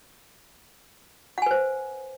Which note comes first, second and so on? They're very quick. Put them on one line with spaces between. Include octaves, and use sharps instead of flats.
F#5 G#5 B4 C5